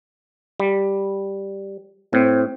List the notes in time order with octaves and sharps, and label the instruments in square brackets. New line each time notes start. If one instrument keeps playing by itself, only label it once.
[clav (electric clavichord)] G3
[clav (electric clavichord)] A2 [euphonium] C4